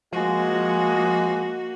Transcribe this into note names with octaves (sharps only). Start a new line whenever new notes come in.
F3 G#3 A#3 F#4